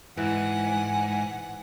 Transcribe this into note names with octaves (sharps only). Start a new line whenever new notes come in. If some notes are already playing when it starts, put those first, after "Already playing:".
G#2 E3 F#5 G#5